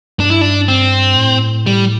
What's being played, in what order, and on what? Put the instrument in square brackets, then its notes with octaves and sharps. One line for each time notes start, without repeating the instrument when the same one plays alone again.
[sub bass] G2 [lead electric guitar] D4
[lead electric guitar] E4
D4
C4
[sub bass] A2
[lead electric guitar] G3